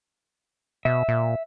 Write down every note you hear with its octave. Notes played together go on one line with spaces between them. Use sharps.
B2 E5
A#2